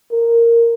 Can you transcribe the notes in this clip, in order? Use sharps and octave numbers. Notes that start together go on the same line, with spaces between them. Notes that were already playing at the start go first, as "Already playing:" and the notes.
A#4